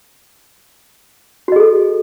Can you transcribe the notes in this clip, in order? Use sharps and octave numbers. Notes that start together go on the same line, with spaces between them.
F#4 G#4 A4 D#5